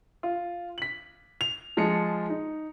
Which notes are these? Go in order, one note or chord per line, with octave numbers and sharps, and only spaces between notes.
F4
B6 F#7
F7
F3 G#3 D#5 A5 C#7
D#4